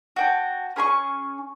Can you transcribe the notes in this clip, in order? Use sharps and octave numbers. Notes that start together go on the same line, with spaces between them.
F#4 G5 A5
C#4 G#4 B5 C#6